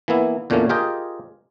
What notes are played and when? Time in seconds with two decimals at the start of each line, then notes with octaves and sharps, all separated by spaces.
0.08 E3 A#3 B3 E4
0.50 E2 A#2 D3 A3 A#3 C#4
0.69 F4 G4 G#4 A#4 D#5 G5